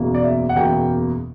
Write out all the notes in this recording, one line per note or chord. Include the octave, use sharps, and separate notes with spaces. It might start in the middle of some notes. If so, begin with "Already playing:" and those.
Already playing: F#1 E2 B2 A#3
D5
E5
F#5
F#1 E2 B2 A#3 G5